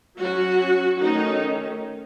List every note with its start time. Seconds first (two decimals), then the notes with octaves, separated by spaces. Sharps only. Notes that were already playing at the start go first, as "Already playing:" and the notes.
0.20 F#3 C#4 F#4
1.01 D#3 A3 C#4 D#4